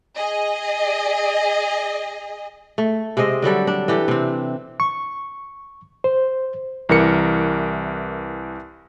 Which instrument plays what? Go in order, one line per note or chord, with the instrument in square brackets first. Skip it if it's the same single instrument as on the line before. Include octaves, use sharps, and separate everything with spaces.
[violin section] G#4 D#5
[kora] A3
C3 G#3 C4 D#5
D3 F#3 G3 A4
D4
E3 G4 A4
C3 C4
[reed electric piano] C#6
C5
[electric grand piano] C2 E3 A#4 C#7